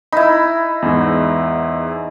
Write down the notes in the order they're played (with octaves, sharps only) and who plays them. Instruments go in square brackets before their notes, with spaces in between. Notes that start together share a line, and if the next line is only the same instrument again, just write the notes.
[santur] D#4 E4 [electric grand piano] B5
[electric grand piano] E2 G#2